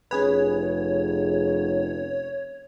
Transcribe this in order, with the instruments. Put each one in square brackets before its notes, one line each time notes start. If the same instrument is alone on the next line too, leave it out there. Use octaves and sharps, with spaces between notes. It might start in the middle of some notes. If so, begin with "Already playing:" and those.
[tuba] F1 [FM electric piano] C#4 G#4 B4 [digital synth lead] C#5